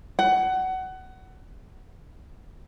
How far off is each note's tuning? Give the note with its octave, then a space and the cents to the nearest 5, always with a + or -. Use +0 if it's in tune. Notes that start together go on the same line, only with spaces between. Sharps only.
F#5 +20